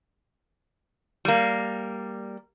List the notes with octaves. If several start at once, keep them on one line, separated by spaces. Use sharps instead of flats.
G3 A#3